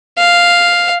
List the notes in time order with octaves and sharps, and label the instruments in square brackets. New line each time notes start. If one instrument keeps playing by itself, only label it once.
[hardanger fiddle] F5